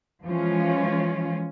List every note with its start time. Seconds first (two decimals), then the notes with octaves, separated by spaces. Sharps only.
0.24 E3 F3 G#3 C#4 F4